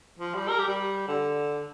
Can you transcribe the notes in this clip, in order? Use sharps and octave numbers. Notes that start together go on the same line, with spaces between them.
F3
G3
A#4
G4
G3
D3